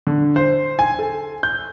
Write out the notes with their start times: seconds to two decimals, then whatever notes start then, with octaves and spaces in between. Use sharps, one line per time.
0.07 D3
0.36 C5
0.79 G#5
0.99 A4
1.43 G6